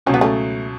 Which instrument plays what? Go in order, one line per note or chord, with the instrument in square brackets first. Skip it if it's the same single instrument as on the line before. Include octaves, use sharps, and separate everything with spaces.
[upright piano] C#2 B2 F#3 [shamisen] C#4
[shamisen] B3
A3 C#4